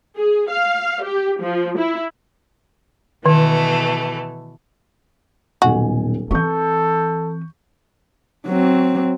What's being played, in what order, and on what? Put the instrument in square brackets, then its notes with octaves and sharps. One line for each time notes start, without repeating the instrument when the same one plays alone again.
[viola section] G#4
F5
G4
F3
E4
[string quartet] B2 E3 A3 [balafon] D#3
[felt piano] D#1 B1 G#5 [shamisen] F#4
[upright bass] E3 C4 [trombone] A4 [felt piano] C#6 G6
[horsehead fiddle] F#3 C4